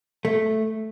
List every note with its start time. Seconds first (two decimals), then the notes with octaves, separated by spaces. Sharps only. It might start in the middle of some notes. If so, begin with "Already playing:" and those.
0.25 A3